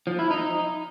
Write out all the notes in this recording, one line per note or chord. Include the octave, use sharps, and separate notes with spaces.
F3
E4
D#4